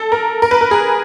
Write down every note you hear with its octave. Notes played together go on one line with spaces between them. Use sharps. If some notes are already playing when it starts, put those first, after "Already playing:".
Already playing: A4
A#4
A#4
B4
A#4
G#4